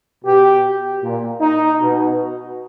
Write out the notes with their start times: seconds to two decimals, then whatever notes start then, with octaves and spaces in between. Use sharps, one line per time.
0.25 B2 G4
1.03 A#2
1.41 D#4
1.81 B2